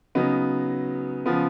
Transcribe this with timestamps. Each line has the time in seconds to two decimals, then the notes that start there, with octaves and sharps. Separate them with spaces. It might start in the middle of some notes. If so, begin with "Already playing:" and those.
0.15 C#3 F#3 B3 D#4
1.26 C#3 F3 B3